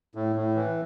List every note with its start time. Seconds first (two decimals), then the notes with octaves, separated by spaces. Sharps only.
0.15 A2
0.36 A2
0.56 E3